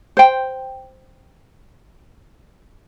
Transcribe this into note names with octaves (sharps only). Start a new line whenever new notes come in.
C5 G5